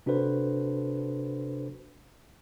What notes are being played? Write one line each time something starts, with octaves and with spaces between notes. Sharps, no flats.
C3 D4 F#4 A4 B4 C5